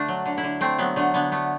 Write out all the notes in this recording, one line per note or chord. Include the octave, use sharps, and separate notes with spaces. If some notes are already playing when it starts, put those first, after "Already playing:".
Already playing: D3 A3 D4
F#3
D3
E4
D3
A3 C4
F#3 B3
D3 A3
D3 B3
A3 B3